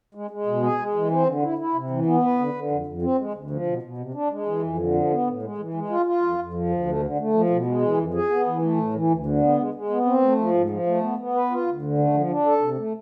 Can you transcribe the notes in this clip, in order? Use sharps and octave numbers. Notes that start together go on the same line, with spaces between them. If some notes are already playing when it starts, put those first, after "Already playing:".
G#3
G#3
B2
G#4
G#3
E3
C4
D3
E4
E4
C3
E3
B3
B4
D3
D3
F2
F2
C4
G#3
D2
F3
B2
B2
C3
D4
G#3
E3
F2
D3
F3
B3
A2
G#3
E3
G#3
F4
F4
F2
F2
F3
D2
A3
D3
A3
F3
B2
G#3
E3
F2
G#4
B3
E3
A3
A2
E3
D2
D3
B3
G#3
G#3
B3
C4
A3
F3
G#2
F3
A3
B3
B3
B4
F4
D2
D3
A3
F3
D4
A4
C3
A3